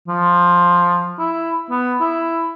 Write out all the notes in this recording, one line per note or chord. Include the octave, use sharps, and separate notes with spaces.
F3
E4
B3
E4